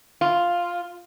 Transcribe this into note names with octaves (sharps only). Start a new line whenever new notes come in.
F4